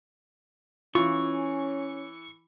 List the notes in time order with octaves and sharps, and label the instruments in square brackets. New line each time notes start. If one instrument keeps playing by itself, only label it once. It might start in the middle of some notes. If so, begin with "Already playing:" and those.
[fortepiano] E3 [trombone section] C#4 [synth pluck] F4 [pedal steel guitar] C#6